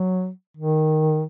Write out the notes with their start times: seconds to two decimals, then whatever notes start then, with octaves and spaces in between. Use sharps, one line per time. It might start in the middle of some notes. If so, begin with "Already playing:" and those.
Already playing: F#3
0.57 D#3